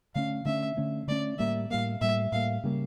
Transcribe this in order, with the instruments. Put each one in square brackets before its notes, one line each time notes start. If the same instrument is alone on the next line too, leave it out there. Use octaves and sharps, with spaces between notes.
[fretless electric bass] D3 A3 C#4 [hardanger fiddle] F5
[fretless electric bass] D3 A3 C#4 [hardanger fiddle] E5
[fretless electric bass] D3 A3 C#4
[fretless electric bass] D3 A3 C#4 [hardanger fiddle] D5
[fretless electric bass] A2 G3 A#3 [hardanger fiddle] E5
[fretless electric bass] A2 G3 A#3 [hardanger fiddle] F5
[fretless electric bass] A2 G3 A#3 [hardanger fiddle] E5
[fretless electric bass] A2 G3 A#3 [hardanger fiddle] F5
[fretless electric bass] C#3 G3 A#3 C#4